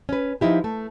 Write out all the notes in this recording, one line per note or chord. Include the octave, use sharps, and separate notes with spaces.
C#4 B4
F3 D#4 E4 G4
A3